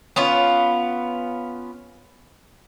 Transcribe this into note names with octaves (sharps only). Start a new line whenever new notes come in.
B3 C#4 F4